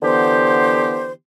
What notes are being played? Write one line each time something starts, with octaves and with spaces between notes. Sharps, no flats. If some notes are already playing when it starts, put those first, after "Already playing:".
D3 E3 B3 G4 C5